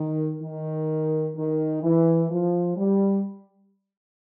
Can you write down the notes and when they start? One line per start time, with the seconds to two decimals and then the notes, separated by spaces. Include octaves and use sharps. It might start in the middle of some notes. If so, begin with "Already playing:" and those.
Already playing: D#3
0.42 D#3
1.36 D#3
1.82 E3
2.30 F3
2.77 G3